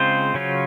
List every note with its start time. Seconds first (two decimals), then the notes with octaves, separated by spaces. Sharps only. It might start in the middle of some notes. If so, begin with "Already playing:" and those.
Already playing: C#3 G#3 C4 F4 C5
0.34 C#3 F#3 C#4 F4